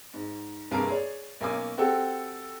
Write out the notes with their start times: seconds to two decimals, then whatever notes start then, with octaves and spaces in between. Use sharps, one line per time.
0.14 G#2
0.71 C2 G2 A#3 G#4 A#4 A5
0.88 G#4 C#5 D5
1.41 B1 A#3 C#4 G#5 D6
1.78 C4 F#4 G4 A4